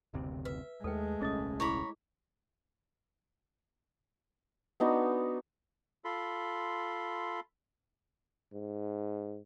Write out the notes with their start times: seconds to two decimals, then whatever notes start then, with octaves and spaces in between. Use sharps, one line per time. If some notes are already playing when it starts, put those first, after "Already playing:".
0.14 F#1 D2 C3
0.45 B4 E5
0.84 D#2 G#3 A3 A4 B4 G5
1.21 D#1 C2 C#4 G#4 D#5 D#6
1.60 E4 G#4 C#5 A#5 B5
4.80 B3 D4 D#4 F#4
6.05 F4 A4 B5 C6
8.53 G#2